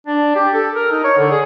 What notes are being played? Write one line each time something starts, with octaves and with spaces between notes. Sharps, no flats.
D4
G4
A4
A#4
D#4
C#5
D3
G#4